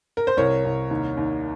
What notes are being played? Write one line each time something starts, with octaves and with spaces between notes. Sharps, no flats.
A#4
C5
C2 A#4 C#5
C2
D#2
D#2